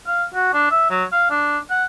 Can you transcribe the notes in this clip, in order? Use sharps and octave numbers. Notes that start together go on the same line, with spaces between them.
F5
F#4
D4
E5
F#3
F5
D4
F#5